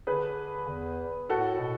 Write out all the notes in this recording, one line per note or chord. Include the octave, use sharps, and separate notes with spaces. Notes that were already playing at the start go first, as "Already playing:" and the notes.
D3 G#4 B4
E2
A2 F#4 A4
B2